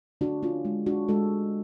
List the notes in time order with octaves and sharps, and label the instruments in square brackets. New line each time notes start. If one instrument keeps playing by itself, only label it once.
[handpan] D3 D4 F#4
C#4 F4
G#3
D4 F#4
G#3 F#4 A4